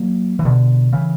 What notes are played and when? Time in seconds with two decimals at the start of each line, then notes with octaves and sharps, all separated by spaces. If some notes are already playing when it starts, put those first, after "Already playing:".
Already playing: F#3 A#3
0.39 E3
0.45 B2 D3
0.93 C#3 E3